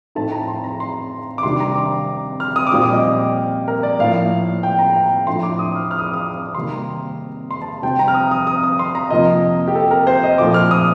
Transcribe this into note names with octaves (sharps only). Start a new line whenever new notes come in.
A2 A3 C4 D#4 A5
A#5
C6
A#5
C6
D6
C3 D#3 G3 D4 C6
A#5
D6
F6
D#6
D6
A#2 G3 C4 F4 D#6
D6
D#5
A#4
D5
A2 F3 A#3 F5
G5
A#5
G5
A2 F3 A3 D4 C6
D6
D#6
F6
F6
D#6
D6
D#6
C3 D#3 G3 A#3 C6
A#5
C6
A5
C3 G3 C4 G5
A#5
F6
D#6
D#6
D#6
D#6
C6
A#5
F2 C3 F3 A#3 F4 D#5
G4
A4
A#4
C5
D#5
A#2 F3 A3 D6
F6
D#6